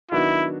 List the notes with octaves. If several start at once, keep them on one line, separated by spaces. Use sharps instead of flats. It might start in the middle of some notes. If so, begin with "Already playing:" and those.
D#3 F#3 B3 D4 E4 F#4